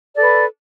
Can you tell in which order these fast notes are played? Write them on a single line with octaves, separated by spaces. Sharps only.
A4 D5 B4